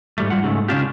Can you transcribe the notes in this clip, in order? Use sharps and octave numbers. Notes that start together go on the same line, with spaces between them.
G#2 G3 A3
G3 F4 F#5
G#2 C#3 A3
C#3 G#3 C#4 D4 F4 G4